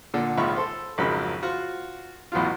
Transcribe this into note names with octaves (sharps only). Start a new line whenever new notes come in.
A#2 D3
G#1 C#2 F4 E5 B5 C#6
A4 C5
G#1 F2 C#3 F#3 A#4 B5
F4 F#4 C5 F#5
A1 E2 B2 F#3 F4